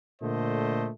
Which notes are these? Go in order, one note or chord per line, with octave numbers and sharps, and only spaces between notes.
A#2 D3 A3 C5 D#5